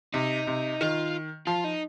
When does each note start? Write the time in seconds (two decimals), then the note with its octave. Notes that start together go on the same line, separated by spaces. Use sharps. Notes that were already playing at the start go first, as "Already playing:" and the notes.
0.14 C3 D#4
0.47 C3
0.81 D#3 F4
1.47 F3 F4
1.64 D#4